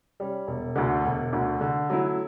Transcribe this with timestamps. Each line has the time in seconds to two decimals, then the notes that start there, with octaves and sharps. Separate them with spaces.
0.20 G3 C#4
0.47 E1
0.76 D2 D3
1.04 E1
1.33 D2 D3
1.61 D3
1.90 F#3 A3 E4